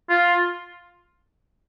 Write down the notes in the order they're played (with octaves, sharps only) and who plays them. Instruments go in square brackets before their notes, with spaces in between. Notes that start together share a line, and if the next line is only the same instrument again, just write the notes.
[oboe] F4